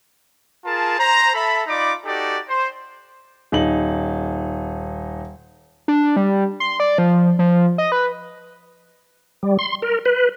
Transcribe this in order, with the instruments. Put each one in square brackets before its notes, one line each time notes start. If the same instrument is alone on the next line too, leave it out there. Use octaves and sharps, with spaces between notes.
[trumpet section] F4 G#4 A#4 A5
C5 A#5
A4 E5 A5 B5
D#4 F4 D5 B5 D6
D#4 F#4 G4 A4 D5
C5
[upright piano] D#1 D#4 F#7
[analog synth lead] D4
G3
C6
D5
F3
F3
D#5
B4
[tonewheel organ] G3
C6
A#4
B4